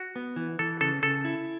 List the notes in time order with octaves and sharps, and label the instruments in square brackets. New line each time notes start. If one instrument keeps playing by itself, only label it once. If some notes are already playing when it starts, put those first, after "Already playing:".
Already playing: [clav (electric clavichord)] F#4
[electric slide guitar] B3
E3
[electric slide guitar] E3 [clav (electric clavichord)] A4
[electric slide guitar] C#3 [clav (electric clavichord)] A4
[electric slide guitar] C#3 [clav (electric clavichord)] A4
[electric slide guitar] E4